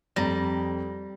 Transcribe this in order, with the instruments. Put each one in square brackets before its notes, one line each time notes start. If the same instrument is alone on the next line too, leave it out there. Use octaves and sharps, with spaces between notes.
[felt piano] F2 A#5 A#6 [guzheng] G3